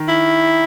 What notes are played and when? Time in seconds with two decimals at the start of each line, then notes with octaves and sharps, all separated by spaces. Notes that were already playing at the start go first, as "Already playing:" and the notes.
Already playing: D#3
0.08 E4